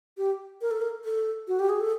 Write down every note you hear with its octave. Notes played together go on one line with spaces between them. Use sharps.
G4
A#4
A4
A#4
A4
F#4
G4
G#4
A4